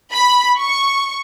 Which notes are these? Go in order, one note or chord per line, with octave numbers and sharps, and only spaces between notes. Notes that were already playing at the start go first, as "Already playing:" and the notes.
B5
C#6